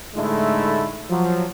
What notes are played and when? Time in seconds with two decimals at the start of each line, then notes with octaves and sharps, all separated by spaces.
0.15 A2 D3 G#3 A3 D#4 E4
1.10 F3 F#3